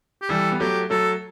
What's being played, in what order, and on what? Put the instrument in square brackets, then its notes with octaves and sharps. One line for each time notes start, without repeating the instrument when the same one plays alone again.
[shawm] G4
[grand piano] E3 G3 [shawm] A4
[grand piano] B3
[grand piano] F#3 A3 [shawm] G4
[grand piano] F#3 A3 [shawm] A4